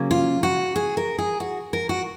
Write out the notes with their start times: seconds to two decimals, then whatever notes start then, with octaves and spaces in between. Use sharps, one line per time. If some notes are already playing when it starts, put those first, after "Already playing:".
Already playing: C#3 F#3 A#3 C#4
0.11 F4
0.43 F#4
0.76 G#4
0.97 A#4
1.18 G#4
1.40 F#4
1.73 A#4
1.89 F#4